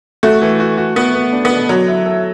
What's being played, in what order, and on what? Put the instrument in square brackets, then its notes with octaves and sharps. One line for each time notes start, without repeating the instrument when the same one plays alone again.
[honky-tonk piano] A3 [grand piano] F#4
[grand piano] E3
F#4
F#4
[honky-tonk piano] B3 [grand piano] F#4
[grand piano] B3
D4
[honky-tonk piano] B3
[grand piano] B2
[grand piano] D3 [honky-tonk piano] F#3
[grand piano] E4
A4